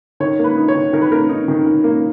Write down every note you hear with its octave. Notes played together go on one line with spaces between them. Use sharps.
D#3 C#5
A#3 B4
D#4
C#5
D#3
D#3 A#4
B4
A#3 A#4
D#4
D#3
D#3
A#3